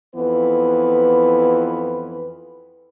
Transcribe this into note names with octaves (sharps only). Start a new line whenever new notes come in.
F2 E3 B3 B4